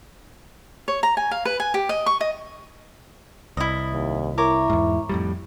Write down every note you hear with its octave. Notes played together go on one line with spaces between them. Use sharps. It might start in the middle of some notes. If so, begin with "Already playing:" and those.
C#5
A#5
G#5
F5
B4
G#5
G4
D#5
C#6
D#5
C2 E4 D#5
D#2
E4 A#4 C#5 D6
E2 G#2
F2 A2 G3